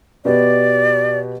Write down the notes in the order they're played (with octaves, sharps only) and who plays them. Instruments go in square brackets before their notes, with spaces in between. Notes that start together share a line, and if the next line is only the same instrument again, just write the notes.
[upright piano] B2 G4 B4 [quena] D5